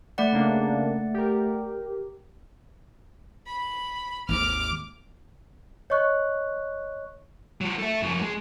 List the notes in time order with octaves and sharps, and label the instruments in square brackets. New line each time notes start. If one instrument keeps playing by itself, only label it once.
[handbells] A3 D5 F#5
[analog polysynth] C#3 A#3 D4
G4 A#4
[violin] B5
[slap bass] G#1 D#2 [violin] D6 F6
[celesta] C#5 D#5 C#6 F#6
[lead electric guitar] F#3 F4
A4 E5
F#2 F3
G#3